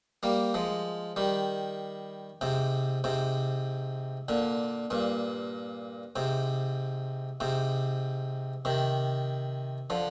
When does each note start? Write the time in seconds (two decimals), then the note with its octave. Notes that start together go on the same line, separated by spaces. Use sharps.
0.23 G3 A#3
0.54 F3 G#3
1.16 D#3 G3
2.41 G#2 C3
3.04 G#2 C3
4.28 A#2 D3
4.90 G2 A#2
6.16 G#2 C3
7.40 G#2 C3
8.65 C3 D#3
9.90 D3 F3